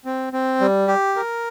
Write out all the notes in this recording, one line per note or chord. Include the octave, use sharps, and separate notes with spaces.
C4
C4
G3
G4
A#4